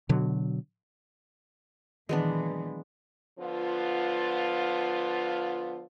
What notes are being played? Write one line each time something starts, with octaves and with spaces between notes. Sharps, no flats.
B2 D3 F#3
A#2 D#3 E3 F#3 G#3 B3 D4
D3 F3 B3 F4